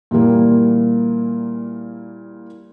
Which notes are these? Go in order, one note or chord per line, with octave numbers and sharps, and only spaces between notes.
A#2 E3 G3 A#3